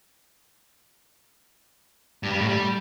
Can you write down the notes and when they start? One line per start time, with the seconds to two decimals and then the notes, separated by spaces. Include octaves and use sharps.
2.23 G2
2.32 G3
2.40 A2
2.49 G3